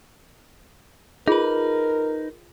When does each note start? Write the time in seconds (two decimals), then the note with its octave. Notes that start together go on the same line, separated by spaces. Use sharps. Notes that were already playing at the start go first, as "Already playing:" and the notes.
1.28 D#4 F4 G#4 A#4 B4